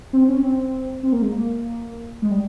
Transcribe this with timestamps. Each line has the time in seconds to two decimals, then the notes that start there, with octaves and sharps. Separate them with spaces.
0.13 C4
0.28 C#4
0.43 C4
1.03 C4
1.12 A#3
1.22 G#3
1.32 A#3
2.22 G#3
2.31 G3